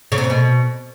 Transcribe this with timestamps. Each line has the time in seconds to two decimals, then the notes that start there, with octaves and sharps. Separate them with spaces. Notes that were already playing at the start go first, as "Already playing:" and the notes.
0.12 C#3
0.18 C3
0.24 C#3
0.30 B2